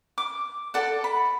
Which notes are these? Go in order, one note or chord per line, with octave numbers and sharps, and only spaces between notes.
D6
A4 D5 F#5
B5